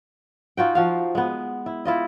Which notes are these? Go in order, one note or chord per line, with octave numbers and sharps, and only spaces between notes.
D#4 F4 F#4 G5
F3 F#4 F5
G#3 B3
E4
E4 F4 D#5